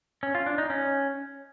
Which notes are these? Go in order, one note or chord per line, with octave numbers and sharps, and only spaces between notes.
C#4
F4
D4
D#4
C#4